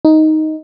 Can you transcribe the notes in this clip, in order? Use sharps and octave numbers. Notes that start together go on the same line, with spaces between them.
D#4